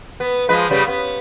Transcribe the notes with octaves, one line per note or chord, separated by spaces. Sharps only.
B3
F3 G#3 B4
C#3 G3 B3
B3